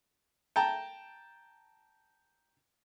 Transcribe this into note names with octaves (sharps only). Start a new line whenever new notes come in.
G5 A5 A#5